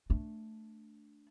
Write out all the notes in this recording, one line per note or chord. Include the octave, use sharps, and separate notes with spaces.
A3 D4